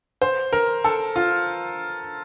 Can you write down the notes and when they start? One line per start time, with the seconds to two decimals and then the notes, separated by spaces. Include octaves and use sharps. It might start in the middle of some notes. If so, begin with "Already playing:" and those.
0.22 C5
0.53 A#4
0.84 A4
1.16 F4